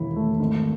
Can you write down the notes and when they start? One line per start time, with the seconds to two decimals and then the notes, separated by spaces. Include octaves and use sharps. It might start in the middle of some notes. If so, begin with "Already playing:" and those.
Already playing: E1 D#2 E4
0.16 A3
0.40 G#1